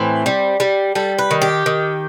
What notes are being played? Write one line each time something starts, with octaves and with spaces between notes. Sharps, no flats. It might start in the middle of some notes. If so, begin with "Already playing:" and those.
Already playing: A2 E3 C4
G3
G3
G3 A4
B4
D#3
G4
D#3